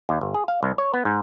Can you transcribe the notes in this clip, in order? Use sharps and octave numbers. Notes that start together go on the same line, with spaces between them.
D#2
G1
G#4
F5
C2
C#5
B3
G#2